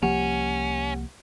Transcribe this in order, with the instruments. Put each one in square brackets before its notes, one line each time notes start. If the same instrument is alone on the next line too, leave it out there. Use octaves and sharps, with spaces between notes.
[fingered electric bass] C2 F3 A#3 [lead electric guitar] C#4 [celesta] G4 F#5